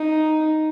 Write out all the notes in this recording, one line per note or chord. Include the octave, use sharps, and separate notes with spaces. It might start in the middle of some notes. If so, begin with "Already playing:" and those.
Already playing: D#4